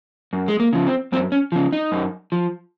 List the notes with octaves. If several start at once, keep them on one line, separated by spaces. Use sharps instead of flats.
F#2
G#3
A#3
C#3 F3
C4
F#2 C4
C#4
C#3 F3
D#4
F#2
F3